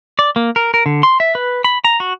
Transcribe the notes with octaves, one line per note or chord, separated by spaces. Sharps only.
D5
A#3
A#4
A#4
D3
C6
E5
B4
B5
A#5
F#4